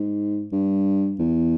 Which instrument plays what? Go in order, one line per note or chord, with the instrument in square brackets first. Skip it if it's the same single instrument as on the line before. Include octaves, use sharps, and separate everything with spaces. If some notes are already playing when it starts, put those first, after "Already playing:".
Already playing: [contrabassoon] G#2
G2
E2